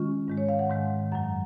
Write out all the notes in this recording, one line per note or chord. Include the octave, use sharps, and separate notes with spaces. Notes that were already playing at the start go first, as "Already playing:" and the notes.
Already playing: D#3 G#3 C#4 F4
G#2 D#3 G#3
C#5
F5
F#5
G#2 D#3 G#3
F#2 D#3 F#3 F#5